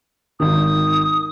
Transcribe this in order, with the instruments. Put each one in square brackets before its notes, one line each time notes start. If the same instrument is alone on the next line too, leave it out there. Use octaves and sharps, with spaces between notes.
[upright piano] G#1 D#3 [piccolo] D#6